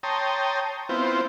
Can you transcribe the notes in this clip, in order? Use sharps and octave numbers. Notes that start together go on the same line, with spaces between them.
C#5 G5 A5 A#5 C6 D#6
B3 C4 E4 F4 C5